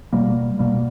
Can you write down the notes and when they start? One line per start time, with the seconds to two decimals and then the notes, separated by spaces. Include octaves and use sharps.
0.13 B2 G3 A#3
0.59 B2 G3 A#3